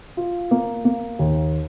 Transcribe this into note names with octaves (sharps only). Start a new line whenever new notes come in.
F4
A#3
A#3
D#2